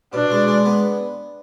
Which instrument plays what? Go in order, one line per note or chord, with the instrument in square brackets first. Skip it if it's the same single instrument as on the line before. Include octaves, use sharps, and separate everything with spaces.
[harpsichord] B2 [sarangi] D4
[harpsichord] G#3
G#3
B3